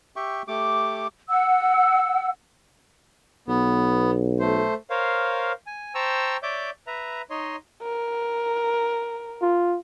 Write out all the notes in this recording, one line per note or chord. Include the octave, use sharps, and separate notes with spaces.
G4 E5 G5 C#6
A3 G4 D6
F#5 E6
B1 B3
A3 C5
A#4 C5 C#5 F5
G#5
C5 G5 A5 A#5 C#6 E6
C#5 D5 E5 D6 G6
B4 E5 A#5
D#4 C#5 D#5 C6
A#4
F4